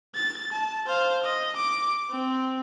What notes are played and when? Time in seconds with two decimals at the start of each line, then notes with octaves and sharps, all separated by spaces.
0.16 A6
0.52 A5
0.87 C5 F5
1.24 D#5
1.56 D6
2.10 C4